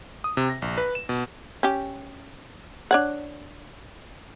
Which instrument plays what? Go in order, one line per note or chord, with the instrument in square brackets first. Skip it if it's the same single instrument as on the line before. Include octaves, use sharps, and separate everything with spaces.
[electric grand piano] D#6
C3
A#6
A#1
B4
E7
B2
[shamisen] C#4 G4
D4 C#5 F#5